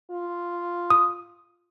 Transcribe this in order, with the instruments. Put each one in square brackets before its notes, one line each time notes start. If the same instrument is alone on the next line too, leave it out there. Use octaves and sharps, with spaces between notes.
[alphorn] F4
[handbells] D#6